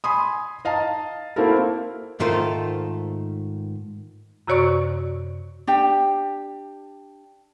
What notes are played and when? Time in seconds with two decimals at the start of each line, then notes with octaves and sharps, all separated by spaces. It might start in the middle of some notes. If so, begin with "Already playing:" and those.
0.04 G#5 B5 C6 D#6
0.65 D#5 F5 A5 A#5
1.36 A#3 C4 E4 F#4 A4 A#4
2.20 G#2 D#3 A3 F4 A#4 C5
4.47 F#2 C3 F#4 C#5 D5 C#6
5.67 D4 G4 G5